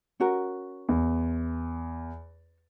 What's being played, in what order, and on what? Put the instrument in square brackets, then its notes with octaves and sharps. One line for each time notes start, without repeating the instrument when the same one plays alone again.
[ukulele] C#4 F#4 A#4
[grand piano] E2